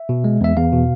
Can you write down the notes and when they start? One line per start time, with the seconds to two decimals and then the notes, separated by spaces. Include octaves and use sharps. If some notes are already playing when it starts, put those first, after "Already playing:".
Already playing: E5
0.09 B2
0.24 G#3
0.41 E2 E5
0.56 E2 F5
0.72 B2